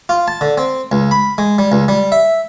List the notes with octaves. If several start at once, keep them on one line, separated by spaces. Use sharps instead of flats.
F4
A5
D3
C4
C#2
B5
G#3
G3
C#2
G3
E5